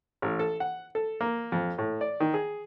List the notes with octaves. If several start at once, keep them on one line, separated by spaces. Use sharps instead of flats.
A1
A4
F#5
A4
A#3
F2
A2
D5
D#3
G#4